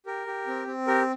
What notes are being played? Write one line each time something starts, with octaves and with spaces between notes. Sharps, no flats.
G4 A#4
G4
C4
C4
G4 A#4